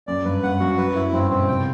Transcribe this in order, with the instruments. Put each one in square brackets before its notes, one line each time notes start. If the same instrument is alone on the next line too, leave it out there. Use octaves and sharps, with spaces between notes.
[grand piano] F#2 [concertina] D5
[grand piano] G2 [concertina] B4
[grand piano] G2 [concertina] F#5
[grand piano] F#2 [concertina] F#4
[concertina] B4
E4
[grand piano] G2 [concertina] C4
[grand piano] B2 [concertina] C4
[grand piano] C3 [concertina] G5